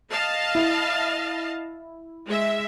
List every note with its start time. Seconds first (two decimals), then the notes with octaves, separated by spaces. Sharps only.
0.11 D#5 F5 A5
0.55 E4
2.26 G#3 E5